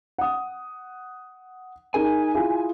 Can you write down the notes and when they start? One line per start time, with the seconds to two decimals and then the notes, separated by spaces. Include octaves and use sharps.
0.18 F#5 D#6
1.94 D#4 G#4 A#4 G#5
2.34 E4 F4 G#4